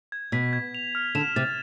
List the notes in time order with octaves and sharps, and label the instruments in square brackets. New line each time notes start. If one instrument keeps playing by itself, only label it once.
[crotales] G#6
[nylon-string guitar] B2 [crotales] B6
[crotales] G#6
F7
F6
[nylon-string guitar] D3 [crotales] E7
[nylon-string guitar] C3 [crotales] A6